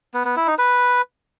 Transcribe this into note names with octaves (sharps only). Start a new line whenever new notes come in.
B3
B3
E4
D#4
B4